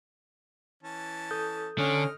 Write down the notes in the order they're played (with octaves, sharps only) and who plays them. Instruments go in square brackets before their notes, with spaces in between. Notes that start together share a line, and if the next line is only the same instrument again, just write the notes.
[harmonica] E3 C#4 A5
[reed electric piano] A4 D#6 G6
[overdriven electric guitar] D3 [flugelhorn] C#4 [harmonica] D#5 F6